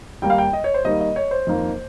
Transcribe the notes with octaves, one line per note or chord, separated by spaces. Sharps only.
D#2 D#3 G3 A#3 G5
F5
G5
D#5
C#5
C5
D#2 D#3 G3 A#3 D#5
D#5
C#5
C5
F2 D#3 A#3